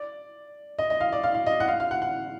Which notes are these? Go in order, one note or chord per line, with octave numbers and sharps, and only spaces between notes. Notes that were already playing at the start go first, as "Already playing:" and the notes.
Already playing: D5
D#5
D#5
F5
D5
F5
F5
D#5
F#5
F5
F5
F#5
F#5